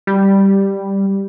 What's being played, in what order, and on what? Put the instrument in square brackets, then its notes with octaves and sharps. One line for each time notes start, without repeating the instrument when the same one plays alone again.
[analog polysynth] G3